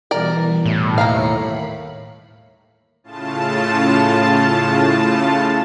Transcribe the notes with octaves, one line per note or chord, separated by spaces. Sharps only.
B2 E3 G3 A#4 D5
A2
D#2 A#3 A#4 F5 C#7
B5
A2 C#3 F4 A5